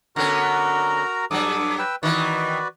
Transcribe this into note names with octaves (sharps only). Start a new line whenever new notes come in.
D3 B3 C#4 F#4 A#4 A#5
G2 F#3 A4 D5 D6 D#6
B4 G5 E6
D#3 E3 F#4 B4 D5